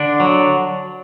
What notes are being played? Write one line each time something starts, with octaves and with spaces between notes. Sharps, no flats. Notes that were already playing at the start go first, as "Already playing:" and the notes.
Already playing: D3 D4
F#3